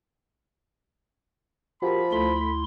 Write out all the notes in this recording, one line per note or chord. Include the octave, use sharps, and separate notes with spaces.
F3 F#4 G4 A#4 B5
D2 A3 E4 C6